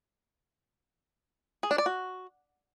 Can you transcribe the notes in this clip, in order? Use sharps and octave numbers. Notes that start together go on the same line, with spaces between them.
G#4
D4
D5
F#4